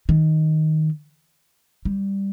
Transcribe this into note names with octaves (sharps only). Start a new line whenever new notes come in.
D#3
G3